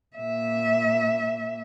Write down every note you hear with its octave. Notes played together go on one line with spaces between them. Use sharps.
A#2 E5